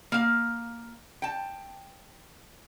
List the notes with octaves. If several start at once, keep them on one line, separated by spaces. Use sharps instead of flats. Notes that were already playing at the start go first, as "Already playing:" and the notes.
A#3 F5
G5 A5